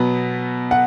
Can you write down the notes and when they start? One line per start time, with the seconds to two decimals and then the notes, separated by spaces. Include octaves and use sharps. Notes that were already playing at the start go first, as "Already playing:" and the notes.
Already playing: B2 F#3 B3
0.71 F#5